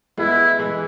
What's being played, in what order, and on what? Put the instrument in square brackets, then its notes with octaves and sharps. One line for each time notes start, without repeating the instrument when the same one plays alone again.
[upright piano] G#3 B3 [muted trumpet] E4
[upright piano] E3 G#3